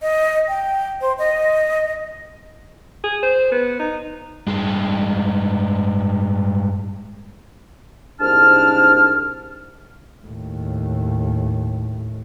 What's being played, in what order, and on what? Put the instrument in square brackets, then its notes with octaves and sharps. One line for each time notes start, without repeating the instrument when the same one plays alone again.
[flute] D#5
G5
C5
D#5
[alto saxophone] G#4
C5
B3
D#4
[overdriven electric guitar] G2 G#3
[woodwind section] C2 G#2 D4 A5 F6
[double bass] D#2 A2